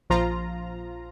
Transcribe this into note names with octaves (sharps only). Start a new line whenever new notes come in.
A#1 F3 F4 A#5